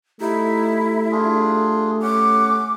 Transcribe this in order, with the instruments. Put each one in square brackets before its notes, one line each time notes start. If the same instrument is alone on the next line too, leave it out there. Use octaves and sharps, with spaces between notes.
[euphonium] A3 [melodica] D#4 [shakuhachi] E4 [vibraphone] G4
[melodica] D4 F4 G#4
[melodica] C#4 F#5 [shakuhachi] D6